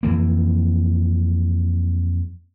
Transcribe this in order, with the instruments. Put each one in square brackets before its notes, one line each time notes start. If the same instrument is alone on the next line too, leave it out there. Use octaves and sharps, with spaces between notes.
[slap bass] F2 E3 A#3